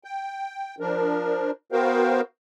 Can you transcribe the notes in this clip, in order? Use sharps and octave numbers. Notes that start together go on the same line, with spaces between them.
G5
F3 D4 A#4
B3 F#4 A#4 C5 F5 G5